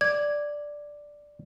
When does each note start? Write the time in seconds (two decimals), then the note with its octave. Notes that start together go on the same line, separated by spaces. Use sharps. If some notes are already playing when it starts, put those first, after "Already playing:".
0.01 D5 G#6